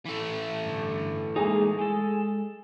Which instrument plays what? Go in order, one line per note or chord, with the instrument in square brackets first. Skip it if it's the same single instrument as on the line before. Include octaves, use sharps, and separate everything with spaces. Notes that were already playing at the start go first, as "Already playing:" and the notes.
[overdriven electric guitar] E3 A3
[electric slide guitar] G2 D3
[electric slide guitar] G#3 A#3 D#4 [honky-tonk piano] G#4 G#5
[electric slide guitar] G#3 A4